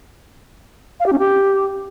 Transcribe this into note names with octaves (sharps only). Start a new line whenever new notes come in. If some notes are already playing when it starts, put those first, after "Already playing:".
F5
G4
C#4
G4